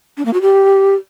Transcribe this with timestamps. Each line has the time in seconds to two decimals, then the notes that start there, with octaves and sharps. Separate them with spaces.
0.17 D4
0.25 A#3
0.33 F#4
0.42 G4